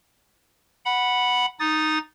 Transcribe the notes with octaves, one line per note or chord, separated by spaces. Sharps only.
F#5 B5
D#4 D#6 A6